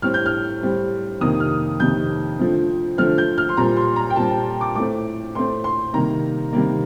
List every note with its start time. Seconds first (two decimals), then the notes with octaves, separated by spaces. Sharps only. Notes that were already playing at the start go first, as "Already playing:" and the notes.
0.02 A2 G3 C4 F6
0.14 G6
0.26 F6
0.61 A2 G3 C4
1.21 F2 C3 D#3 A#3 D#6
1.40 F6
1.80 F2 C3 D#3 A#3 G6
2.39 D3 F3 A3 C4
2.98 D3 F3 A3 C4 F6
3.18 G6
3.38 F6
3.49 C6
3.57 A#2 G3 C4 A#5
3.77 C6
3.96 A#5
4.10 G5
4.16 A#2 G3 C4 A5
4.31 A5
4.61 D6
4.75 A2 A3 C4 D6
5.35 A2 A3 C4 C6
5.64 C6
5.93 C3 D#3 G3 A#3 A#5
6.53 C3 D#3 G3 A#3